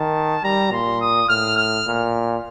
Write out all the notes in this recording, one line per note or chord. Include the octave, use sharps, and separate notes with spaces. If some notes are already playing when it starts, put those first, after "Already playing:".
Already playing: D#3 A5
G3 A#5
A#2 C6
D#6
A2 F6
F6
A#2